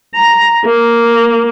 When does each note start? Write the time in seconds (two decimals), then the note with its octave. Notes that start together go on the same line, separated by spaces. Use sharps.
0.15 A#5
0.65 A#3